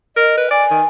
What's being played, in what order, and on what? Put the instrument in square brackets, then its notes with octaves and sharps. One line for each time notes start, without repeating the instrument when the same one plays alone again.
[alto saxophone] A#4 [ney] D#5
[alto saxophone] B4
[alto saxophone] D5 [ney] G#5
[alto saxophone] D#3